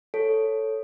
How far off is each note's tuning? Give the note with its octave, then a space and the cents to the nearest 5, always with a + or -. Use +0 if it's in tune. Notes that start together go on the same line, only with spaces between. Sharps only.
A4 +0 C#5 +0